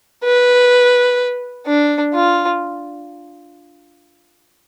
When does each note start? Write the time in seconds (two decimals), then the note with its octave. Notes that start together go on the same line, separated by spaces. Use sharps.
0.24 B4
1.66 D4
2.14 F4